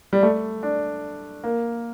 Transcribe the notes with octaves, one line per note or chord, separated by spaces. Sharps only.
G3
A3
D4
A#3